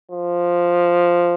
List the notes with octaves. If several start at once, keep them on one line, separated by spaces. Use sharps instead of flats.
F3